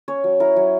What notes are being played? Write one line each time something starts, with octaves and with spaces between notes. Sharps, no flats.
C#4 C#5
F#3
E4 A#4
F#3